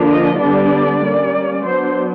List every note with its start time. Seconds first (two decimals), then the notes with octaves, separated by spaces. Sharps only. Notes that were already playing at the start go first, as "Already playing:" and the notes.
Already playing: D3 F3 A#3 D4
0.10 D#5
0.41 D3 G3 B3 D4 D5
1.03 G3 A#3 C#4
1.65 F#3 B3 D4 C5